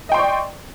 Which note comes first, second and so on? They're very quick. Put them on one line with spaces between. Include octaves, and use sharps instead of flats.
D#5 G5 C6 D5 C#6